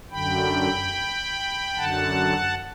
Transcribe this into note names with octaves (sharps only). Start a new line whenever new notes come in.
F#2 D3 G5 B5
F#2 D3 F#5 A5